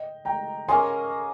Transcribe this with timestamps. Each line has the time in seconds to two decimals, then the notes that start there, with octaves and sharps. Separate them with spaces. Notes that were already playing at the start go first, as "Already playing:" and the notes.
Already playing: D#5 G5
0.25 G5 A#5
0.68 A#3 C#4 G#4 D#5 G#5 C6